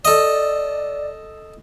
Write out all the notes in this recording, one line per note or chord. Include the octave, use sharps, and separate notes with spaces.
A4 D5 D#5